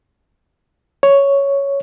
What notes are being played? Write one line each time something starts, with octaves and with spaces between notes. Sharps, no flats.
C#5